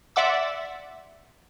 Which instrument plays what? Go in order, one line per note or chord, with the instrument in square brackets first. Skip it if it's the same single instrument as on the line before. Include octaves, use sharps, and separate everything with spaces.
[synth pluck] D5 E5 F#5 C6 D6 E6